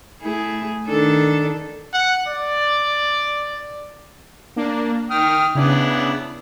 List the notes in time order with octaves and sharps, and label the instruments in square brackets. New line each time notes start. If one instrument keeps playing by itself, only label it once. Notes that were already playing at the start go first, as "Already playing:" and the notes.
[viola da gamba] A3 E4 G#4
D#3 D4 A4
[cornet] F#5
D5
[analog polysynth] A#3 D4
[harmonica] D#3 G5 D#6 [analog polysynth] F6
[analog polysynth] C#3 [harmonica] B3 D4 E4